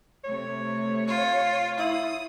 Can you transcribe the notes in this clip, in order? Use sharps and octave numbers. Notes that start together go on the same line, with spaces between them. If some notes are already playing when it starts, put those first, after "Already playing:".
C3 A3 C#5
F4
E4 D#6